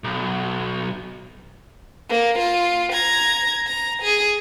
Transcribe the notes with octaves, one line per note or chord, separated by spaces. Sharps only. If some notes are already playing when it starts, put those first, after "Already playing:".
B1
A#3
F4
A#5 G#6
A#5
G#4